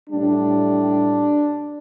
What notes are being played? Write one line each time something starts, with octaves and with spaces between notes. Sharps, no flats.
A2 G3 D4